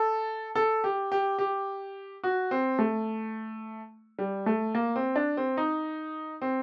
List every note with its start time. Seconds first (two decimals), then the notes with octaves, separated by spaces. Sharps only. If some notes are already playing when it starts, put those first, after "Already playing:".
Already playing: A4
0.55 A4
0.84 G4
1.12 G4
1.39 G4
2.23 F#4
2.51 C4
2.79 A3
4.19 G3
4.46 A3
4.75 A#3
4.96 C4
5.16 D4
5.37 C4
5.57 D#4
6.42 C4